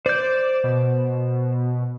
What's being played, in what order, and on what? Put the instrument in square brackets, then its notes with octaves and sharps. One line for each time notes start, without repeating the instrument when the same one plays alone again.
[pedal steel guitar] C5 G6 [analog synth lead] D5
[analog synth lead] B2